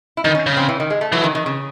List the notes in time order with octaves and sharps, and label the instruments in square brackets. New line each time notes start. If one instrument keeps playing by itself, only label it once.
[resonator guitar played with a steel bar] E4
[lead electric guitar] D#3 [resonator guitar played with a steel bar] D#4
[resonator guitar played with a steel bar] C#4
[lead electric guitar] C#3
[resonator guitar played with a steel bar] C4
E3
D#3
G#3
A3
[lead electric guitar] E3 [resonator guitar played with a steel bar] F#3
[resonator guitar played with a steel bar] D#3
D#3
C#3